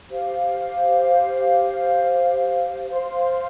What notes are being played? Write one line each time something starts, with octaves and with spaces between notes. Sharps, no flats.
G4 C5 F5
C5 F5 C6